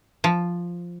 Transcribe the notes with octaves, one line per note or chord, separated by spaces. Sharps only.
F3